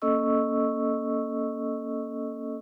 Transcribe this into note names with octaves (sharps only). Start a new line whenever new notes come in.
A#3 C#4 A4 D#5 C#6 E6